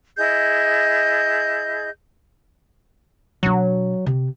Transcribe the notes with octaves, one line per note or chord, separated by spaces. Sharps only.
E4 G#4 D#5 G6
B2 F#3 D4
C3